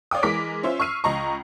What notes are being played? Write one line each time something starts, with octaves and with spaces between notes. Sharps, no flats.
C#5 D5 F5 G5 D#6
E3 G#3 A#4 D6 B6 D7
C#4 F4 C5 E5
C#6 E6 F6 C7 D#7
C#2 D#5 A#5 C#6